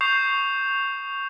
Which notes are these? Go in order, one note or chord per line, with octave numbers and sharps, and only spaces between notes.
C#6 D#6 G6 C7 E7 F7